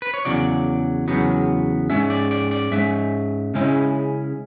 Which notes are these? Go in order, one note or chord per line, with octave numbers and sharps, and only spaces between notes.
B4
C#5
E2 C#3 F#3 D5
E2 C#3 F#3 B3
G#2 G#3 C#4 E5
D5
D5
D5
G#2 G#3 C#4 E5
C#3 G#3 C#4 E4